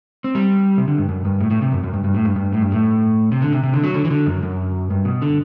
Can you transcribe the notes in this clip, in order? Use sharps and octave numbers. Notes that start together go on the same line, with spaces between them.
C4
G3
C3
D3
G2
F#2
G2
A2
A2
C3
F#2
F#2
G2
G2
A2
G2
G2
A2
G2
A2
C3
D3
C3
C3
D3
F#3
D3
E3
D3
F#2
F#2
G2
B2
D3